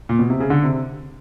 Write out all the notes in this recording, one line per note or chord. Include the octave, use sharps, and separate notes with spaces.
A#2
B2
C3
C#3
D3
C3